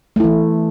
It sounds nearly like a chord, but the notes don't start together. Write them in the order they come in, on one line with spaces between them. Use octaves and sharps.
A3 E4 E3